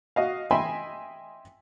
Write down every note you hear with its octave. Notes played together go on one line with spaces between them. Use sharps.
F#4 D#5 F5
D#5 E5 G5 G#5 B5 C6